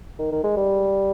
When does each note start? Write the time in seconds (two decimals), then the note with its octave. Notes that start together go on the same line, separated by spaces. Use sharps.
0.19 D#3
0.32 D#3
0.44 G#3
0.57 G3